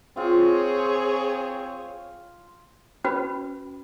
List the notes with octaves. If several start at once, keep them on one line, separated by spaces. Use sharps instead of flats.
C4 F4 G#4 C#5
C#4 F#4 B4 B5